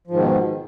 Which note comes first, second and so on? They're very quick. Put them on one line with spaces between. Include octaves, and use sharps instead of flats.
F3 G#2 D#3 B2